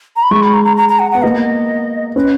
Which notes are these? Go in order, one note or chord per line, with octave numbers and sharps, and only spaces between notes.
A#5
B5
G#3 C#6
B5
A#5
A#5
A#5
A#5
F#5
B3 F#5
A#3 D#5
C#4 B4